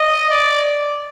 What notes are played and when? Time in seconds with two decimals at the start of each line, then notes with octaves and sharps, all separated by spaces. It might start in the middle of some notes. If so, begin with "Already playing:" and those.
Already playing: D#5
0.30 D5